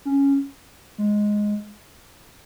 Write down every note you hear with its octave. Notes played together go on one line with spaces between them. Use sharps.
C#4
G#3